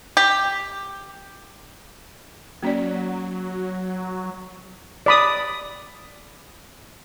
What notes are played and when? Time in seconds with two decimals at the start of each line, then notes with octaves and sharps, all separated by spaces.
0.17 G4
2.63 F#3 A#3 C#4 D5
5.06 D5 B5 D#6